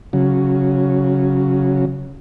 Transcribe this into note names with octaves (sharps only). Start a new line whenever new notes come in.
C#3 F#3